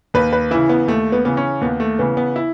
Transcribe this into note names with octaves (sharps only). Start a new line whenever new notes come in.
D#2 B4
B4
C#3 E3 E4
B3
D#2 A3
B3
C#3 E3 B3
C#4
D#2 B3
A3
C#3 E3 B3
B3
E4